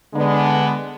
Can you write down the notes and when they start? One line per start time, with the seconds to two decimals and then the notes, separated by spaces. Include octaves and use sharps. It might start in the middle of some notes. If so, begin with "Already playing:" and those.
0.13 D3 G#3 B3 D4